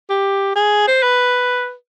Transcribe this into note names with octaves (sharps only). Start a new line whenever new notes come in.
G4
G#4
C5
B4